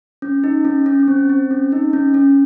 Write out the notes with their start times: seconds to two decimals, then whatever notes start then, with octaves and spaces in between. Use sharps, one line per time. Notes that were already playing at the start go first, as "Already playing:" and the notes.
0.22 C#4
0.44 D#4
0.65 C#4
0.86 C#4
1.00 C#4
1.08 C4
1.29 C4
1.51 C#4
1.72 D#4
1.93 C#4
2.14 C#4